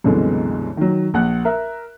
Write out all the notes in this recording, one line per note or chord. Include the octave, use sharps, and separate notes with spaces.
C2 F#2 B2 D3 E3 G#3
D#3 F#3
A#1 F#5 F#6
A#4 E5